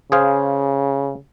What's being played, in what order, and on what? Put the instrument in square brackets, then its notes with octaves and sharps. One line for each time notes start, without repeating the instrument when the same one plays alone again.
[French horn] C#3 [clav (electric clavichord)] G#4 C5 F5